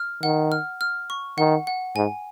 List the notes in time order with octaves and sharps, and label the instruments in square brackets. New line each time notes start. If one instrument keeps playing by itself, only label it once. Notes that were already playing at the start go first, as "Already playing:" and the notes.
Already playing: [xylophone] F6
[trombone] D#3 [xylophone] F#5
[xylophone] F6
F6
C#6
[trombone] D#3 [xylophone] F#5
[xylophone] F#5
[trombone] G#2 [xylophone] G#5